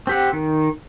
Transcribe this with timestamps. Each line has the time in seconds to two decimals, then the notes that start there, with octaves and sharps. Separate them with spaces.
0.07 C4 G4 F#5
0.33 D#3